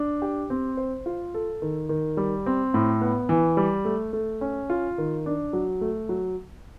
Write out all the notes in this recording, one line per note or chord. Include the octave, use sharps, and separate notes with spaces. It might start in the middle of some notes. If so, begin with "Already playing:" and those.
Already playing: D4
G4
C4
C5
F4
A4
D#3
D#3
G3
C4
A2
B3
E3
G3
A3
A3
C#4
F4
D#3
D4
F#3
A3
F#3